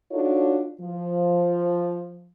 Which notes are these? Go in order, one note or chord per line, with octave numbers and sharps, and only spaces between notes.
D4 D#4 F4 F#4 A4 C#5
F3